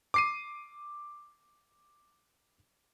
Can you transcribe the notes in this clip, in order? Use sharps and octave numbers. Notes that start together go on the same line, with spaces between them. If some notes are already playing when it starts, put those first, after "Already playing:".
D6 C7 D#7